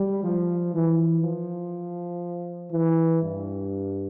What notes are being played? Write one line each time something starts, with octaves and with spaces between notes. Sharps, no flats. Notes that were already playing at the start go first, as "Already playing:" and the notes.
Already playing: G3
F3
E3
F3
E3
G2